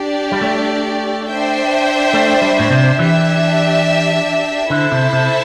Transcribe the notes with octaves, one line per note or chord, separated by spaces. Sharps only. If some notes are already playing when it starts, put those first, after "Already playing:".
Already playing: D4 G4 D5
G3
A3
D4 C5 E5 G5
A3
G3
A2
C3
E3 D4 G4 E5
D3 E4 A4 C5 E5 A5
C3
C3